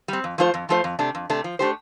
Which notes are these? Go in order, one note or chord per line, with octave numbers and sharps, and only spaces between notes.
G3 C4
F2
F3 A3 F4 C5
F2
F3 A3 F4 C5
F2
C3 A3 D4
F2
C3 A3 D4
F3
A3 D4 G4 C5